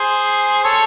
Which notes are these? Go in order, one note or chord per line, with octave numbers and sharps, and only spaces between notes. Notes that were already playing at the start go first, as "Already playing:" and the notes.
Already playing: G#4 C5
A4 C#5